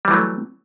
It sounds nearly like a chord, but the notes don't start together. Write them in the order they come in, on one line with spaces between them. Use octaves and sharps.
G3 E3 F#3 A3